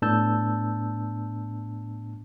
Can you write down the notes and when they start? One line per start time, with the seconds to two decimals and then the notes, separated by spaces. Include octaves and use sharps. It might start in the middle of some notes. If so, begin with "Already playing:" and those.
0.02 A2 B3 D4 A5 E6 G6